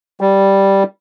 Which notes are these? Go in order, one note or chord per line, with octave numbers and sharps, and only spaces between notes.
G3